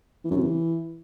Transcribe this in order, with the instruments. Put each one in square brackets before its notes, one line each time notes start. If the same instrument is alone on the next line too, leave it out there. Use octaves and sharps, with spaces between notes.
[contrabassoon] E3
F#2
C3
E3